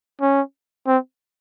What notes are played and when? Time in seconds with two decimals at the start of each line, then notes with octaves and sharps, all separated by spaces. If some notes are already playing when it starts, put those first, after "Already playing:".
0.21 C#4
0.87 C4